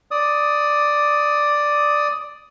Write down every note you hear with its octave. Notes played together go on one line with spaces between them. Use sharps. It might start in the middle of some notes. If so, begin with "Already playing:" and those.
D5 D#6